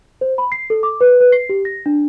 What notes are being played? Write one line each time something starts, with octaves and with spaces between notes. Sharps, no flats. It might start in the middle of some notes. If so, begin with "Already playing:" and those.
C5
B5
C7
A4
D6
B4
B4
C7
G4
A#6
D4